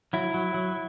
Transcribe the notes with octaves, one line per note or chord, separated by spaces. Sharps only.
F#3 E4
F#3
F#3